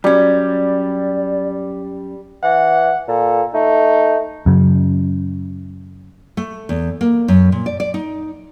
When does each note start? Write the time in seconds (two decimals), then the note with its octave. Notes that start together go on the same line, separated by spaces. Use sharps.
0.04 F#2 G3 C#4 D5
2.43 E3 F#5
3.08 A#2 A4
3.54 A3 D#4
4.46 F#2 C#3
6.37 A3
6.69 E2
7.01 A#3
7.28 F#2
7.52 A#2
7.66 D5
7.80 D5
7.94 D#4